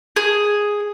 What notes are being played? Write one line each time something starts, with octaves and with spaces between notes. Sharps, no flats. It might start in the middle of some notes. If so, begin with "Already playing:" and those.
G#4